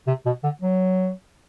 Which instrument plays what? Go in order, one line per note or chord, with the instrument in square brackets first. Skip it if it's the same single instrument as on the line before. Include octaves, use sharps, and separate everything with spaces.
[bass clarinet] C3
B2
D3
F#3